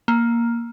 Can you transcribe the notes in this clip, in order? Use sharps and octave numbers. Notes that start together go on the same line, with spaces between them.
A#3